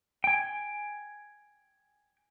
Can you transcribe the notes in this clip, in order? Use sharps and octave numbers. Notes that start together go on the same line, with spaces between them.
G5 G#5